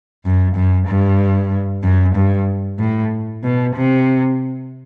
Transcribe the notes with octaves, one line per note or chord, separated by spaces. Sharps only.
F#2
F#2
G2
F#2
G2
A2
B2
C3